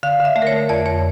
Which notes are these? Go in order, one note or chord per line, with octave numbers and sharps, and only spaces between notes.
D3 F5
D3
E5
A3
A#4
C#5
A3
F2 D5
F2 C#5